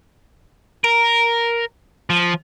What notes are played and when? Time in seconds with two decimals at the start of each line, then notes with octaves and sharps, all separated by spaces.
0.84 A#4
2.10 F3